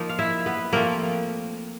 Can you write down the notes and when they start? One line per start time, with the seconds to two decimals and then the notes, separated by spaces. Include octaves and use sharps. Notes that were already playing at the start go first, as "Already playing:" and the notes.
Already playing: F3 A#3 D#4
0.09 F5
0.19 E4 E5
0.46 B3 B4
0.73 F3 A3 A#3 C4 A#4